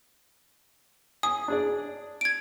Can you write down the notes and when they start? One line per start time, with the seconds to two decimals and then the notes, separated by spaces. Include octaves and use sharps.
1.23 G#5 D#6
1.48 D4 G#4 D5
2.21 G#6 D7